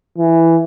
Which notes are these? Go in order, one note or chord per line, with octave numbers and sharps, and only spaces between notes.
E3